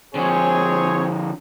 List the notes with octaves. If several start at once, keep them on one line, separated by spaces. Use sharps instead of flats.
D3 F3 C4 G#4 C#5